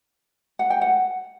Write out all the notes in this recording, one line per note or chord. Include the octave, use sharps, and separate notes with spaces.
F#5
G5
F#5